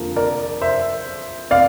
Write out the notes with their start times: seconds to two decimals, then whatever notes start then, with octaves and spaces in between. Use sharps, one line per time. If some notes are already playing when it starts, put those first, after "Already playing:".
Already playing: F2 D3 F3 A#3
0.16 A#4 D5
0.61 C5 E5
1.51 D5 F5